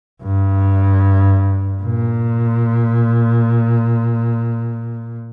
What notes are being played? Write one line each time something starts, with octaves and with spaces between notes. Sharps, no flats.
G2
A#2